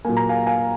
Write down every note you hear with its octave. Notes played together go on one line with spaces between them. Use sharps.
A#2 F#3 A#3 G#5
A#5
F5 G#5
F5 G#5